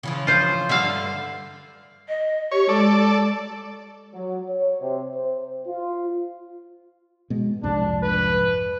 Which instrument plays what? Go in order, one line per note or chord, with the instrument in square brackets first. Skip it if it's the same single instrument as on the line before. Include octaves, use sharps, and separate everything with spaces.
[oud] C#3 E3 F3
[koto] F4 C5
[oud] G2 D3 [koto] E5 F5
[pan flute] D#5
[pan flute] G4 [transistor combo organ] C#5
[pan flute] G#3 [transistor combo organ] A4 D5
[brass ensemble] F#3
C#5
C3
C5
F4
[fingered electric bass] B2 G#3
[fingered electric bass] C2 F2 G#2 [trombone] D4
[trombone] B4